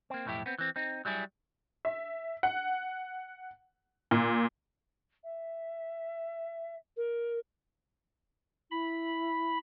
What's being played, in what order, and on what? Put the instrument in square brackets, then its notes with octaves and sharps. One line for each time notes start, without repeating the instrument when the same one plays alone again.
[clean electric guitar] A#3 C4
B1 F2 A2 A3 E4 G4
B3 C4
E3 C4
C4 D#4
F#3 G3 E4 G#4
[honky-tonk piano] E5
F#5
A#2
[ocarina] E5
A#4
[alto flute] E4 [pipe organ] B5